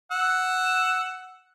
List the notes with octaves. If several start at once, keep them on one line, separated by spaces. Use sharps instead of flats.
F#5 E6